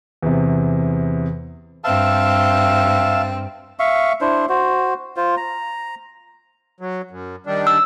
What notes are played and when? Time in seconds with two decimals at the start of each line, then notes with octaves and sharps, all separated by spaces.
0.22 E2 C3
1.84 G2 C4 E5 F5 A5
3.79 E5 F5 C#6
4.21 D4 E4 C5
4.49 F#4 C5
5.17 F4 C5
5.37 A#5
6.80 F#3
7.11 F#2
7.46 D#3 G3 D4
7.67 E6